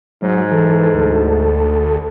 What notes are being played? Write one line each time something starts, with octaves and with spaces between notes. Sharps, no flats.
G#2 F#3
E3 A4
D2